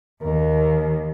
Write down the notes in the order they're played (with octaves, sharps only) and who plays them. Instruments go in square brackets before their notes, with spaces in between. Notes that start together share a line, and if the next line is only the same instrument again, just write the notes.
[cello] D#2 [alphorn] A#4